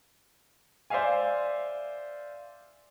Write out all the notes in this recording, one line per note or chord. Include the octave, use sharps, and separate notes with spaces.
C5 D5 E5 F5 G#5